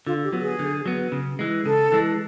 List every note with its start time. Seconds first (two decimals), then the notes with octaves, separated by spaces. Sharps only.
0.07 D3 F4
0.24 G4
0.33 F#3 B3
0.41 G#4
0.59 D3
0.86 F#3 B3
1.12 C#3
1.39 E3 G#3
1.65 C#3 A4
1.92 E3 G#3